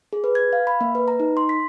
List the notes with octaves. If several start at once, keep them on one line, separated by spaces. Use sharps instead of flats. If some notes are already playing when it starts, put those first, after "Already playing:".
G#4
B4
G#6
F5
B5
A#3
B4
A#5
D#4
C6
B6